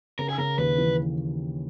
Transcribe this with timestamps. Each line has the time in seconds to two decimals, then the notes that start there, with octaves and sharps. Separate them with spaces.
0.19 C#3 A#4
0.29 G#4
0.38 C#3 A#4
0.58 D#2 B4
0.78 E3